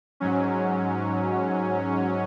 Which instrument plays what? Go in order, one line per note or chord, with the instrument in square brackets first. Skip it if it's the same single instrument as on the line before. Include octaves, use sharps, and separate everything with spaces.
[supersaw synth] G#2 F#3 C#4